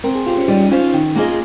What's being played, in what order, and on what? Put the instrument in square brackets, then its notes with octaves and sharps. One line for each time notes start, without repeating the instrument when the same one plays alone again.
[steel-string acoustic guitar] C4 [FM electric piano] A#4
[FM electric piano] G#4
[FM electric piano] F4 [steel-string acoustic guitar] G4 C5
[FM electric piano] C#4
[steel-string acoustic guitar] G3 [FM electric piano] D#4
[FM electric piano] C#4
D#4
[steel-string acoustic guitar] C#4 F4 C5 F5
D#3
A#3 F4 G#4 D#5